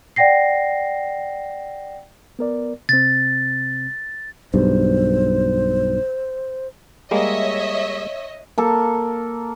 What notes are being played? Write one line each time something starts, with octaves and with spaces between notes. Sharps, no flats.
D5 F#5 G5 A#6 C7
B3 A#4 D5
C3 C4 A6
B1 G2 C5
G3 G#3 A#3 C#5 D#5 E5
A#3 A4